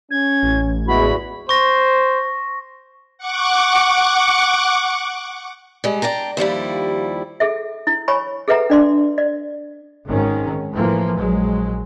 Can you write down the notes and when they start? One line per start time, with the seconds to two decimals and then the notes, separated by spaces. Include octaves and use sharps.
0.11 C#4 G#6
0.43 A1
0.88 E2 G#3 B3 E4 F#4 B5
1.49 C5 C#6 A#6
3.18 F#5 C#6 D6
5.84 G3 G#3
6.02 D4 G5 A5 A#5
6.37 D#2 F3 G3 E4
7.40 G#4 A4 E5
7.87 E4
8.08 C#5 G#5 B5 C#6
8.48 G#4 A4 B4 E5 F#5 A#5
8.70 D4 D5 C6
9.18 D5
10.07 G#1 G#2 D#3 C#4
10.72 A2 E3 F3 A#3
11.18 A#1 F#3 G#3